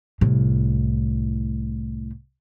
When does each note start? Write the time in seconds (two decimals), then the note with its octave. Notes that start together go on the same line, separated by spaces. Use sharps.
0.21 C2 A2